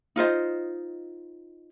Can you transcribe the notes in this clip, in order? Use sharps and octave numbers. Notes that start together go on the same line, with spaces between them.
D#4 F4 C5 D#5